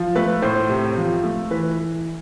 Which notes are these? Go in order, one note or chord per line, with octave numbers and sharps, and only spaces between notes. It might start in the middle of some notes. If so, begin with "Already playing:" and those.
Already playing: F3
A3 B4
A2 C5
C3
F3
A3
E3 B4